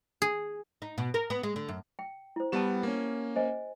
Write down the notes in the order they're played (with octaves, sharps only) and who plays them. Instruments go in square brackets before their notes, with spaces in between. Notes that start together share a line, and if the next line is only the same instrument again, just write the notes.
[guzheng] G#4
[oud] D#4
B2
A#4
B3
G#3
D3
F#2
[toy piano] G5
E4 C5
[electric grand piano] G3 B3 E7 [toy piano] G4 F#5 A5
[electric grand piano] A#3 C#4
[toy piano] C5 D#5 G#5